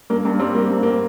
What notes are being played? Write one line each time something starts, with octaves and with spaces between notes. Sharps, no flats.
G2 A#3
G2 A#3
G3 C4
G3 A#3
G2
A#3